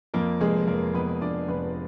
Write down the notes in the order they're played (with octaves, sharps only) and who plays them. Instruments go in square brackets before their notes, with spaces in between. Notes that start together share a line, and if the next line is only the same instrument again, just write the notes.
[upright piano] F2 A#3 A#4
F1 G#3 G#4
F1 A#3 A#4
F2 B3 B4
F2 D4 D5
F1 B3 B4